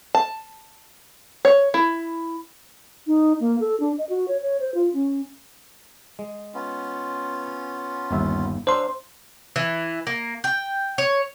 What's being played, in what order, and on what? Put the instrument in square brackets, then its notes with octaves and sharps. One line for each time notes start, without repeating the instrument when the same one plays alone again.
[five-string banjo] A5
C#5
E4
[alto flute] D#4
A#3
A4
D4
D#5
F#4
C#5
C#5
C5
F4
C#4
[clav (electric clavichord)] G#3
[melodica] B3 C#4 F4
[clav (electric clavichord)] G1 D#2 E5
[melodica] F#3 F5 E6 [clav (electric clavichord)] D4 [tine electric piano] C5 C6
[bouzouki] E3
A#3
G5
C#5